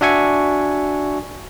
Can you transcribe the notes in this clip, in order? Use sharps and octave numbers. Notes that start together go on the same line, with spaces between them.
D4 F#4 E5 G#5 C#6